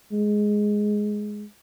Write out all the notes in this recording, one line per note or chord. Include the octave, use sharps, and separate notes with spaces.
G#3